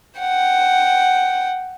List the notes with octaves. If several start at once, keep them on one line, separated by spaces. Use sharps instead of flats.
F#5 G5